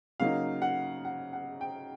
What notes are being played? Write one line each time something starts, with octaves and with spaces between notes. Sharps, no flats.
C#3 F#3 A#3 D#4 F5
F#5
F#5
F#5
G5